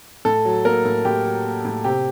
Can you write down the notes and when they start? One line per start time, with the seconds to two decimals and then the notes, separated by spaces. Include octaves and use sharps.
0.25 A2 A4
0.45 F#3
0.65 A#3 A#4
0.85 A2
1.05 A2 G4
1.25 F#3
1.45 A#3
1.65 A2
1.84 C3 G4